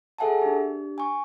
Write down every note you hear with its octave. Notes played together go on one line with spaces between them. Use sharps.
G#4 A4 E5 F#5 G#5 A5
D4 G4
G#5 C#6